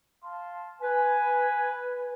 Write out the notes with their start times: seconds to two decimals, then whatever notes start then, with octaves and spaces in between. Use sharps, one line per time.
0.24 F5 A5 C6
0.82 B4 G#5